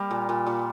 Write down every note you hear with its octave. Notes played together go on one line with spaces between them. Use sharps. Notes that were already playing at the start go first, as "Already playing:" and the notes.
Already playing: G3 A#3
A#2
A#2
A#2